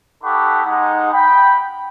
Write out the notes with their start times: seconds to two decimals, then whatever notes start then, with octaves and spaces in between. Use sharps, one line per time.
0.23 D#4 G4 A4 F#5 B5 C#6
0.65 G#3 D#4 F#5
1.12 G5 B5